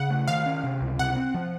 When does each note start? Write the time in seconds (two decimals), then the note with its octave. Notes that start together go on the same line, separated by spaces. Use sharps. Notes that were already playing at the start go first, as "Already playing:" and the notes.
Already playing: C#3 F#5
0.10 A3
0.28 D#3 F5
0.46 C#4
0.64 C3
0.81 C#2
0.99 C3 F#5
1.16 C4
1.34 F3